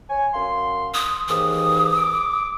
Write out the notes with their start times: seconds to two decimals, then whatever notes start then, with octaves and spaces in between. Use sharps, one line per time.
0.09 C#5 G#5
0.33 F#2 F5 C6
0.94 D#6
1.28 D#2 G#2 E3 D#6
1.97 D6